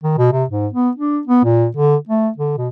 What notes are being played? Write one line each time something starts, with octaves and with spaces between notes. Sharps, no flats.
D#3
B2
C3
G#2
B3
D4
B3
A#2
D3
A3
D3
B2